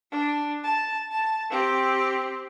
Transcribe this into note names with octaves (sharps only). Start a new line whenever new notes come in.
D4
A5
A5
C4 G4